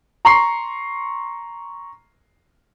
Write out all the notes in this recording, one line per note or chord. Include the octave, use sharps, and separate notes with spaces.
A#5 C6 C#6 C7